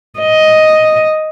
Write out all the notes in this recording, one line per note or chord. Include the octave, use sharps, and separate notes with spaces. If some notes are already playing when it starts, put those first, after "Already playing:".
D#5